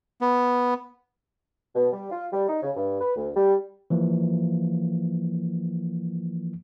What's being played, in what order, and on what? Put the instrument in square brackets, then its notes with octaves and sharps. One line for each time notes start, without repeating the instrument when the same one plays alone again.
[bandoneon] B3
[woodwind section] B2
G3
F4
G3
D#4
C#3
G2
B4
D2
G3
[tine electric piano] E3 F3 A#3